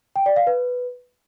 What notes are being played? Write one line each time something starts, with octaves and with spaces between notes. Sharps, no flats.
G5
D5
F5
B4